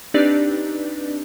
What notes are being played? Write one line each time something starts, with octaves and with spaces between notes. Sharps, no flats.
C4 D4 D#4 G4 B4 D5